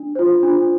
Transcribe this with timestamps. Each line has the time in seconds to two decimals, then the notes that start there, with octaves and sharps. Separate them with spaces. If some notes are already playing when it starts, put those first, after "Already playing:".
Already playing: D4
0.15 F4 C5
0.43 D4